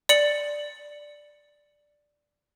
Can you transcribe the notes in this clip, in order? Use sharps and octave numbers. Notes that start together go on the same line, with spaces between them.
D5 C#7 F#7